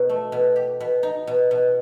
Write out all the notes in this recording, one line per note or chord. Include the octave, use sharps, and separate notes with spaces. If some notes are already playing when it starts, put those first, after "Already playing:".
Already playing: B2 D#4
A3
B2
G4
B2
D#4
B2
B2